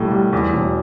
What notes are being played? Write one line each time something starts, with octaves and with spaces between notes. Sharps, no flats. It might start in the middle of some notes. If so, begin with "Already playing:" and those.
Already playing: B1 A2 G3
G3
E2
E1